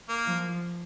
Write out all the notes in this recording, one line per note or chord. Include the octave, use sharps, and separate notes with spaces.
A#3
F3